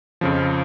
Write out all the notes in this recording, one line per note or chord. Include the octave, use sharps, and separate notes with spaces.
F2 C#3 F3